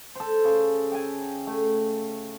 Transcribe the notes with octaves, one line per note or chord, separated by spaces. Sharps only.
A4 C5
C#3
G5 G#5
A3